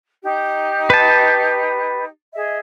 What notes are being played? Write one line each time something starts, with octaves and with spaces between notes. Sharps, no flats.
D#4 G4
B4 A5
G#4 D#5 E5